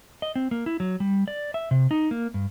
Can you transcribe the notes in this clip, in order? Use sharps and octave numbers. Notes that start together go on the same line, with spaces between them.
D#5
C4
A#3
E4
F#3
G3
D5
E5
C3
D#4
A#3
G2